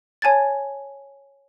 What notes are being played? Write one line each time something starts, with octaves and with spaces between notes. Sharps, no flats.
C#5 G#5 A5 G#6 A6